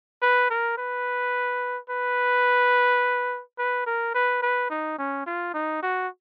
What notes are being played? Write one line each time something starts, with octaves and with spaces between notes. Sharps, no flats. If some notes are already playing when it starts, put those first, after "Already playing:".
B4
A#4
B4
B4
B4
A#4
B4
B4
D#4
C#4
F4
D#4
F#4